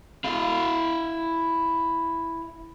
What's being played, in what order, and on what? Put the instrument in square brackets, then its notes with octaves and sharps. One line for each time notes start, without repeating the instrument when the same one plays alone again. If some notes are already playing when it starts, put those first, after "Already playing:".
[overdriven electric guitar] E4 F5